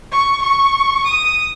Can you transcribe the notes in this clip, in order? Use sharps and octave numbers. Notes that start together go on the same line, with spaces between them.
C#6
C#6
D#6